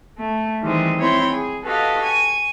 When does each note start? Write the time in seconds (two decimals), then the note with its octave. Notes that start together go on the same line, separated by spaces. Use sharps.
0.19 A3
0.63 D#3 E3 G3 G#3 C4
1.00 C4 E4 C5 C#5 G5 B5
1.33 G#4
1.66 F#4 G4 A4 B4 D#5 F5
2.02 G#5 C#6